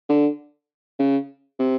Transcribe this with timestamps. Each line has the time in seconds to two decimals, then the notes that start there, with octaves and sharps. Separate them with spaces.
0.09 D3
0.99 C#3
1.59 C3